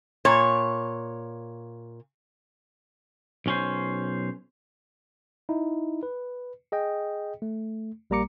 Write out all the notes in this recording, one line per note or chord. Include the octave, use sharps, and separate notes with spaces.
A#2 C#5
B1 C#4 C5
D#4 E4
B4
G#4 D#5 G5
A3
A#1 G3 A#3 A#5 D6 C#7